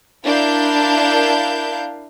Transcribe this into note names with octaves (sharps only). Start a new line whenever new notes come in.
D4 E4 A#4 F5 G6